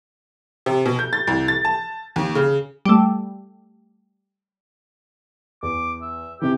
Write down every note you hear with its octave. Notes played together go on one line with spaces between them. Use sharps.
C3
B2
G6
A6
C2
A6
A5
D#2
C#3
G3 A3
E2 D6
E5
C3 E3 G4